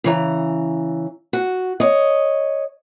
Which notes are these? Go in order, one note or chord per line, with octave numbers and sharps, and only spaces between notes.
C#3 E3 A#5
F#4
C#5 D#5